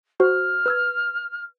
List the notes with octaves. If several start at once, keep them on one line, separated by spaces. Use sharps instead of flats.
F#4 C5 F6
B4 E6 G#6